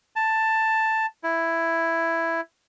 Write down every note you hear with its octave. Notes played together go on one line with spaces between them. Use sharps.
A5
E4